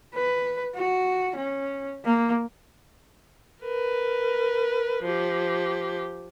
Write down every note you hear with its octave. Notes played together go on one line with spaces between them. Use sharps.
B4
F#4
C#4
A#3
A#4 B4
F3 G4